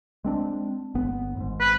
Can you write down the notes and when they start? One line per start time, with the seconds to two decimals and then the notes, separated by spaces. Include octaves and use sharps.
0.24 G#3 C4 D4
0.95 G1 B3
1.36 G#1 G#2
1.60 B4